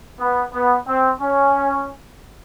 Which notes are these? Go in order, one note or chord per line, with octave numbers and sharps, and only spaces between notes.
B3
B3
C4
C#4